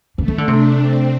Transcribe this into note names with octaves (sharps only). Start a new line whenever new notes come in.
D3 A3
E3
D3
C3 D4
C4